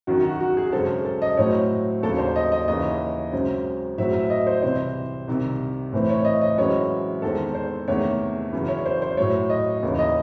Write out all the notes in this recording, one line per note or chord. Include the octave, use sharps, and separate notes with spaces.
F#2 D#3 F#3 F#4
F#4
F#4
G#4
F#2 C#3 G#3 C4 A4
A4
D#5
A2 F#3 A3 C4 C#5
D#2 C#3 F#3 A4
C5
D#5
D#5
D#2 C#3 E3 D#5
F#2 C#3 G#3 C4
A2 F#3 C4 E5
E5
D#5
C5
C2 C3 E3 C4 C5
C2 C3 D#3
A2 E3 A3 C4
C#5
D#5
D#5
F#2 E3 G#3 C4 C#5
E2 D#3 G#3 C4 A4
C5
E2 C3 D#3 A3 C#5
F#2 C#3 E3
C#5
C5
C5
A2 F#3 A3 C#5
D#5
D#2 C#3 E3
D#5